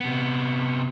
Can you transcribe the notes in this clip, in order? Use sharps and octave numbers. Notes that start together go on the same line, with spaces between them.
C3 B3